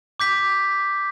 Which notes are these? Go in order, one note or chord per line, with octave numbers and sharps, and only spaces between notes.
D6 G6 B6